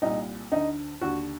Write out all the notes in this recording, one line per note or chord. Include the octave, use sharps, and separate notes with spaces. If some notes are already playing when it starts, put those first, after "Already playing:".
C2 A#2 D#4
D2 D3 D#4
D#2 D3 F#4